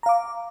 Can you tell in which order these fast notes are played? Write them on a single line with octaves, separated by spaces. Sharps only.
A#5 F5 D6